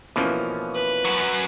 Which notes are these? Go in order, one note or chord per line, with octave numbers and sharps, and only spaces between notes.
B2 E3 F3 A#3 C#4
B4
F#2 F#3